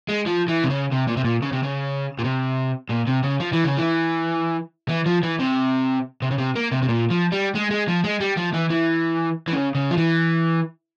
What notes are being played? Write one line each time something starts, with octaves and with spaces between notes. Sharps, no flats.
G#3
F3
E3
C3
C#3
C3
A#2
C3
A#2
C#3
C3
C#3
A#2
C3
A#2
C3
C#3
F3
E3
C#3
E3
E3
F3
E3
C3
C3
C#3
C3
A#3
C3
C3
A#2
F3
G3
G#3
G#3
F3
G#3
G3
F3
E3
E3
E3
C#3
C#3
F3
E3